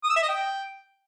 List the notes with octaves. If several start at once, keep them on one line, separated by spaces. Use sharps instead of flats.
D#6
E6
E5
D#5
G5